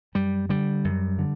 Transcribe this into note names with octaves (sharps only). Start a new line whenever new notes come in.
F#2 G3
D3 G3
F#2
D3